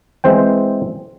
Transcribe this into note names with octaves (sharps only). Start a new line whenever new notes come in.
E3 G#3 C4 C5 G5